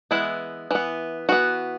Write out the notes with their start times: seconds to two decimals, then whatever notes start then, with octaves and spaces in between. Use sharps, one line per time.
0.11 E3 G#3 B3 E4
0.71 E3 B3
1.29 E3 B3 F#4